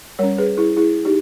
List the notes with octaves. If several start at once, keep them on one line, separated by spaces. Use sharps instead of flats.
G3 C#4 A#4 C#5
G#4 B4
E4 G#4
E4 G#4
D#4 G4